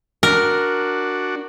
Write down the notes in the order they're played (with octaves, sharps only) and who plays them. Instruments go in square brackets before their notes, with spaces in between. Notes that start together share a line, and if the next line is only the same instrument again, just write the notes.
[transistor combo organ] D4 F#4 [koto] A#4